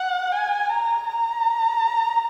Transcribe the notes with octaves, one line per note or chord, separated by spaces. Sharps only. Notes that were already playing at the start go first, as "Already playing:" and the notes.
Already playing: F#5
G#5
A#5
A#5